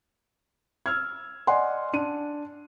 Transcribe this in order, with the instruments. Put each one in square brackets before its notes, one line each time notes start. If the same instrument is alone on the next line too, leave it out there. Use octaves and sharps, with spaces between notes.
[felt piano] E6 F6 G#6
D5 D#5 F#5 G#5 C6
D4 D#7